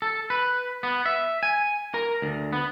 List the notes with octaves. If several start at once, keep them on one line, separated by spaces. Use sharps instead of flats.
A4
B4
B3
E5
G#5
A#4
D2
B3